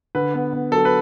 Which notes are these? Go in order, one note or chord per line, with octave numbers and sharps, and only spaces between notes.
D3 B4
B3
B3
F#3 A4
B4